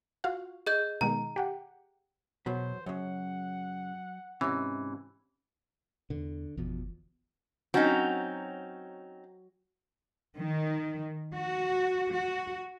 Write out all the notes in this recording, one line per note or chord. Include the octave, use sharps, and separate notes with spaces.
F4 F#4 F5
G#4 D#5 G6
B2 D#3 G#3 A#5
G4 F#5 G5
E2 B2 F#3 B3 C5
F#2 C#3 F#3 F#5
G#2 C3 E3 C#4
E2 D3
G1 E2 B2 F3
F#3 C4 C#4 D#4
D#3
F#4
F#4